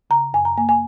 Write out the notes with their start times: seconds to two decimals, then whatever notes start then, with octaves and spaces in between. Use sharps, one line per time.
0.10 C#3 A#5
0.33 F#2 G#5
0.45 A#5
0.57 A#3 G#5
0.69 G#5